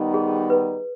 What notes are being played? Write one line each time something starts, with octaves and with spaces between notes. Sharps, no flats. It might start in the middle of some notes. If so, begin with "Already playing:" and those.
Already playing: D#3 G3 B3 D#4
G#4
B4